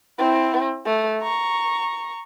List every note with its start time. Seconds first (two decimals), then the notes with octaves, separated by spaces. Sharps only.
0.19 C4 E4
0.86 A3
1.21 A#5 C#6